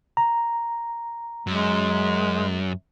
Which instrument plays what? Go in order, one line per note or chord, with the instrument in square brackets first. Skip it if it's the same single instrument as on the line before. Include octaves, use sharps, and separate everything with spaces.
[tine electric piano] A#5
[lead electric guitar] F#2 [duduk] G#3